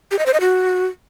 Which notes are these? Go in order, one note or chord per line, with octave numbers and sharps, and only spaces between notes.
G4
D#5
C5
D#5
F#4